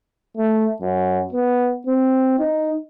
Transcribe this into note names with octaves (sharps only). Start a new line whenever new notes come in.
A3
F#2
B3
C4
D#4